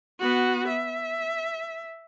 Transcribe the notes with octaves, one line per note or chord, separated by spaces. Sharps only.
B3 F#4
E5